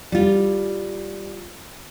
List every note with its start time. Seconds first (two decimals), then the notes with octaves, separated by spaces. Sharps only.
0.12 G3 F4